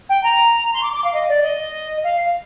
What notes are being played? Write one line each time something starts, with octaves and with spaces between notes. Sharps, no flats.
G5
A#5
C6
D6
D6
F5
D#5
D5
D#5
F5